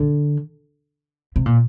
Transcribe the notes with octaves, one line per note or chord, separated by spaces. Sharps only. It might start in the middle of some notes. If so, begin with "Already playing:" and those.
Already playing: D3
C3
A#2